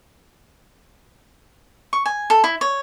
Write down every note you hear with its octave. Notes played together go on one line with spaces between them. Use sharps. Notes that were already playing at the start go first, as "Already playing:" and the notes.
C#6
G#5
A4
E4
C#5